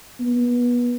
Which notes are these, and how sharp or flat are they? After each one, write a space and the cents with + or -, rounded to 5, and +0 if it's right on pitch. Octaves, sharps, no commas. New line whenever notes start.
B3 -25